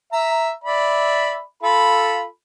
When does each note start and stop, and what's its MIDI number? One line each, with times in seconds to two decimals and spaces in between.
0.12 0.52 76
0.12 0.52 82
0.64 1.41 74
0.64 1.41 76
0.64 1.41 83
1.63 2.25 65
1.63 2.25 69
1.63 2.25 83